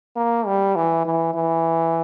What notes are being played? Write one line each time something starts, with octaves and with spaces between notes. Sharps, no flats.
A#3
G3
E3
E3
E3